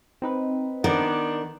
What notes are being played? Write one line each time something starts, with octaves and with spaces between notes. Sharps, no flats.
C4 D#4 B4
D#3 B3 D4